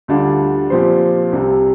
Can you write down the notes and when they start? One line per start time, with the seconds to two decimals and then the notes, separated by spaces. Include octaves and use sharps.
0.08 D2 D3 G3 D4 F4
0.70 A#2 F3 C4 G4 C5
1.32 C2 C3 G3